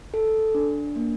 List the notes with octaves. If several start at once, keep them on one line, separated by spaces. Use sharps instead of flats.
A4
D4
A#3